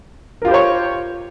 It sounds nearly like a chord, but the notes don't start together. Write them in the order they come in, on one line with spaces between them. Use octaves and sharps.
A#4 F4 G4 C5 C#5